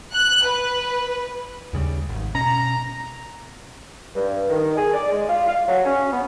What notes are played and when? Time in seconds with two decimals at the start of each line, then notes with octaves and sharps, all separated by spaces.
0.15 F#6
0.45 B4
1.73 D#2 C#3 G3
2.09 G#1
2.35 B2 C#4 A#5
4.15 G2
4.49 D#3
4.77 G#4
4.93 D5
5.12 G#3
5.29 F4
5.48 F5
5.68 F#3
5.85 C#4
6.12 B3